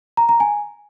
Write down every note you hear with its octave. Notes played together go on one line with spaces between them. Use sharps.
A#5
A#5
G#5